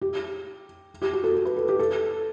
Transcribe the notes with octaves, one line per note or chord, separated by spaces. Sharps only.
G4
G4
F#4
A4
A4
B4
A4
G4
A4